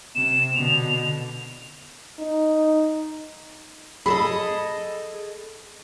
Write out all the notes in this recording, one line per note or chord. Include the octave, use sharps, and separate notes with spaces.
C3 E7
B2 D3 F7
D#4
G#4 A4 D#5 B5